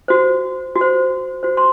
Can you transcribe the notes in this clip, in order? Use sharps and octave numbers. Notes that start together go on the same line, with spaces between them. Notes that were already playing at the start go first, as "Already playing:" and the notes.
F#4 C5
F#4
C5
F#4 C5
C6